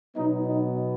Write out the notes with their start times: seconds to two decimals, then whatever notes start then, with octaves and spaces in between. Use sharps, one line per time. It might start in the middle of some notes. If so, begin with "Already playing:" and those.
0.15 B2 F#3 B3 D#4
0.47 D#4